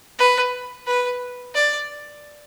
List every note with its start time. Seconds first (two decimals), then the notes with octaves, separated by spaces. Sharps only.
0.18 B4
0.87 B4
1.55 D5